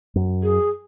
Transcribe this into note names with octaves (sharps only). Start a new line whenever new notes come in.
F#2
G#4